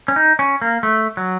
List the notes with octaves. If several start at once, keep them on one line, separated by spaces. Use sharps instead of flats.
C#4
D#4
C#4
A#3
A3
F#3